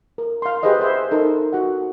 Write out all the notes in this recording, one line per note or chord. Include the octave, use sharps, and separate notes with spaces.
A#4
F5 C6
G4 G#4 B4 C5 D#5
G#4 C5 E5
D#4 A4 A#4
F#4 F#5